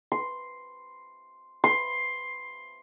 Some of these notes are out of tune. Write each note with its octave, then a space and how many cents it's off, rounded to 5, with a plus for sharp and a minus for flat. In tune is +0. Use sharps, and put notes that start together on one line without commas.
C6 +0
C6 +10